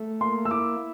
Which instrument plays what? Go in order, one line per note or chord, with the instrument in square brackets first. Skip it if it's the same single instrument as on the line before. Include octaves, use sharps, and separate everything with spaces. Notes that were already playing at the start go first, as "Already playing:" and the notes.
Already playing: [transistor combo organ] A3
[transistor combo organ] A#3 [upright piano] C6
[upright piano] E6
[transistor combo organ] E4 [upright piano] D6